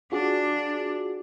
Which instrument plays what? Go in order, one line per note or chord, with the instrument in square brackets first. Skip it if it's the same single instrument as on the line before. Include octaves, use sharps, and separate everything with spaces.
[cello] D4 [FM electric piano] F4 F#4 G#4